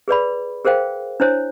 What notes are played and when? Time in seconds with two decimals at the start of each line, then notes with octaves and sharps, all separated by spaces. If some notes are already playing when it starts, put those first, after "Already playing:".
0.08 G#4 B4 D5 B5
0.64 G#4 A#4 C5 F5 G5
1.20 D4 E4 C5 C#5